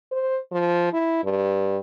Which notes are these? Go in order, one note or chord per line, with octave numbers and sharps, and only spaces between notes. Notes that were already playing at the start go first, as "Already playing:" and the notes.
C5
F3
E4
G2